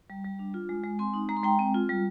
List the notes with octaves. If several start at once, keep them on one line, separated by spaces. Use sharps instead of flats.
G3
G3
D4
F4
G#3
G#3
C4 G#5 C6
D#4
G#3 A#5
C6
G#3 G5 A#5
C4
F4
G3